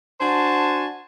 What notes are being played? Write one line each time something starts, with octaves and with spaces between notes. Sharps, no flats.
D4 F#4 C5 G#5 A5